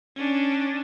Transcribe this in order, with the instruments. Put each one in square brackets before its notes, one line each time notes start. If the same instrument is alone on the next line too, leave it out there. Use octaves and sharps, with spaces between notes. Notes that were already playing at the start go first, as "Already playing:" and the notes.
[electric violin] C#4 D4